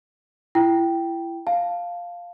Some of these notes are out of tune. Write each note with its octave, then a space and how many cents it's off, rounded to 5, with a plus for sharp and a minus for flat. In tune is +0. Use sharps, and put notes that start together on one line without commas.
E4 +30 G5 -5
F5 +0 A5 +0